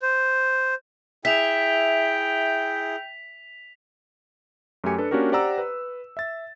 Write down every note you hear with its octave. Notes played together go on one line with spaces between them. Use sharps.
C5
E4 G#4 E5 G5 G6 B6 F7
F#2 A3 G4 G#5 C#7
D4 A4 B4
A#3 C#4 D4 F#4 G4 A#4
G4 C5 D5 F#5 A#5 E6
B4
E5 A6